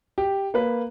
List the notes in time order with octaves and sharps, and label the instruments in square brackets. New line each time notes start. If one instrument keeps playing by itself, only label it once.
[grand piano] G4
A#3 B4